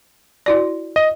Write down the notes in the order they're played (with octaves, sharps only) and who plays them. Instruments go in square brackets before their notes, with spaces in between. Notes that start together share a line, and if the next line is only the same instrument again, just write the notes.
[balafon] E4 F#4 D5
[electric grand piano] D#5